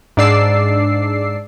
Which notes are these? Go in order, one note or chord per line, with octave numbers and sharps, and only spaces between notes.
G#2 D4 D5 E6 C7